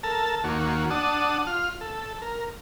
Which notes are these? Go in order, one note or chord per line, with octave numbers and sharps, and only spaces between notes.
A4 A#4 A5
D#2 A#3 F#4
D4 F#5 A5 D#6
F4 F6
A4
A#4